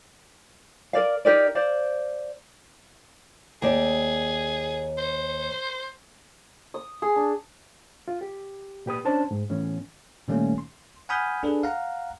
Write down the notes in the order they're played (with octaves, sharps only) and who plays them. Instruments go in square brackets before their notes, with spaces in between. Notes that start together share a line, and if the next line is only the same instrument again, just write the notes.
[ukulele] A#4 D5 F5
D#4 G4 A#4 D5
C5 D5 F5
[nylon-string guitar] D#2 D5 [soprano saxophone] G#4
[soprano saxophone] C5
[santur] D#6
G#4
D4
[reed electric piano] F4
G4
A#2 G4 B4 D#6
C#4 D4 C5 A5
G#2
A2 E3 B3 C#4
[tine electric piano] A#2 D#3 G3 A3 A#3 C#4
C6
F#5 G#5 B5 D#6 F6 G6
D4 G#4 A4 B4
F5 F#5 A#5